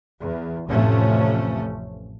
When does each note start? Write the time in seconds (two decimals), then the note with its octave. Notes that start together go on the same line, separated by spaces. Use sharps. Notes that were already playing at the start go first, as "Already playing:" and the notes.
0.20 E2
0.69 A1 F2 C3 F3 A3 C#4